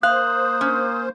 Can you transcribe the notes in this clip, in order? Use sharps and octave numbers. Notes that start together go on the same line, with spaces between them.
A#3 C5 F5 D#6 F#6
C#4